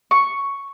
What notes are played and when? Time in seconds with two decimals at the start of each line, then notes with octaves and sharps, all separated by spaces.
0.11 C#6